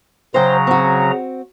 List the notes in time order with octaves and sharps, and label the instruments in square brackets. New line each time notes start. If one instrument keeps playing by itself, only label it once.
[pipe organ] C#3 F#3 A#5 [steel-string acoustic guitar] C5 G5
[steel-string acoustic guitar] C4 F#4